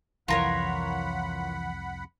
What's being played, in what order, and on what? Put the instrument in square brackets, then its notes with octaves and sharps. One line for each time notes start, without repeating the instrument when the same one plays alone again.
[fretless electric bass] C2 F2 [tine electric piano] E3 [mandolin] F4 A#4 C#5 [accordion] F#5 B5